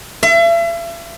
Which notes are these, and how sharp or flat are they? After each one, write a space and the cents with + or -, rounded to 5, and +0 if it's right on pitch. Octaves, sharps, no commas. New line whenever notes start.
E5 +40